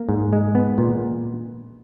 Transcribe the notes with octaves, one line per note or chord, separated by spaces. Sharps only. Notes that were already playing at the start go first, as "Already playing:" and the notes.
Already playing: A#3
G#2
G#3
B3
A#2